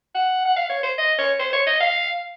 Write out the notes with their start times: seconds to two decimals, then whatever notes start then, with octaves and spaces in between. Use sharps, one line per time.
0.15 F#5
0.45 F#5
0.56 F5
0.69 C#5
0.83 C5
0.98 D#5
1.19 C#5
1.39 C5
1.53 C#5
1.67 D#5
1.80 F5